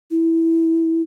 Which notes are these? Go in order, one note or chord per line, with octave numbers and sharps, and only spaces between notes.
E4